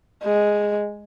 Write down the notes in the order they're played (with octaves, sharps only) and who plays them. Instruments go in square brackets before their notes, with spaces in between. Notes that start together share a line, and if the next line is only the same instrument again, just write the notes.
[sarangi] G#3